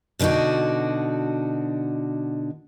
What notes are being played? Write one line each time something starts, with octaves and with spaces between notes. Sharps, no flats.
B2 D3 D4 D#4 F#4